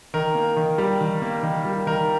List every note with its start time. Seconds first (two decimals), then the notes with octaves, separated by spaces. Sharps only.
0.14 D#3 A#4
0.35 A#3
0.57 D#3
0.78 G3
1.01 D#3
1.22 A#3
1.43 D#3
1.65 G3
1.87 D#3 A#4